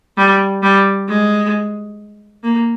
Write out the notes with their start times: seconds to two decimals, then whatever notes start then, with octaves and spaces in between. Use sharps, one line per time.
0.18 G3
0.63 G3
1.08 G#3
2.44 A#3